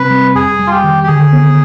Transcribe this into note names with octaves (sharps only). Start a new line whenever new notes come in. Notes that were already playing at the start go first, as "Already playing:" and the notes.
Already playing: C3 G3 C4 B4
G3
F2 G#4
G3
F4
G4
D#3
G4
D3 G#4
B3